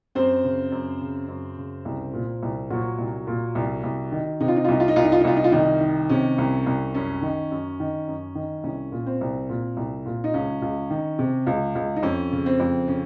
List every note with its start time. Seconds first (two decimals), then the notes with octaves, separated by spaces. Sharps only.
0.15 F#2 C4 C5
0.45 C#3
0.72 F#2
1.01 C#3
1.28 F#2
1.57 C#3
1.85 C2
2.13 A#2
2.43 C2
2.70 A#2 F#3 F#4
2.98 C2
3.27 A#2
3.55 C2
3.84 C2
4.12 D#3
4.40 C3 D#4
4.48 F4
4.56 D#4
4.65 F4
4.68 C2 D#4
4.80 F4
4.88 D#4
4.96 C2 F4
5.05 D#4
5.12 F4
5.21 D#4
5.25 C2 F4
5.37 D#4
5.44 F4
5.52 C2 D#3 D#4
5.81 D#3
6.09 C3 C#4
6.38 C2
6.66 C2
6.94 F#2 C#4
7.22 D#3
7.51 F#2
7.80 D#3
8.08 F#2
8.35 D#3
8.63 C2 C#4
8.92 A#2
9.06 C4
9.21 C2
9.49 A#2
9.77 C2
10.06 A#2
10.24 D#4
10.34 C#2 C#4
10.62 C#2
10.90 D#3
11.19 C3
11.47 C#2
11.75 C#2
11.96 D#4
12.03 F2 C#4
12.32 C#3
12.46 C4
12.60 F2
12.88 C#3 C#4